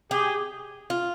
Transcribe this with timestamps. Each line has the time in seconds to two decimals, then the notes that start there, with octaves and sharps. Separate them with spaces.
0.11 G4 G#4
0.90 F4